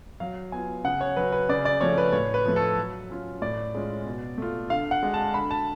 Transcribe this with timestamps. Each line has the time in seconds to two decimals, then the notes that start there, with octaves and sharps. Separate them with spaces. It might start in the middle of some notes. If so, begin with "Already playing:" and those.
0.20 F#3 F5
0.52 B3 F4 G#5
0.85 C#3 F#5
1.01 C#5
1.16 F#3 C#4 B4
1.32 B4
1.49 C#3 D5
1.65 D5
1.81 F3 A3 C#5
1.98 B4
2.13 A2 C#5
2.34 B4
2.46 F3 A3
2.56 A4
2.77 F#3
3.10 C#4 F4
3.42 A2 D5
3.74 G#3 C#4 F4
4.05 B2
4.38 A3 F4
4.70 D3 F5
4.91 F#5
5.03 G#3 D4
5.14 A5
5.34 D3 B5
5.51 A5